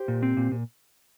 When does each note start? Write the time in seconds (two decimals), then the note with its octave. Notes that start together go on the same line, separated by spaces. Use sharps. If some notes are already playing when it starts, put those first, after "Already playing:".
Already playing: G4 C5
0.08 A#2
0.23 C4
0.37 A#2
0.52 A#2